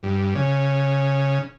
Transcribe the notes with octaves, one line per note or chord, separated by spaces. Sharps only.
G2
C#3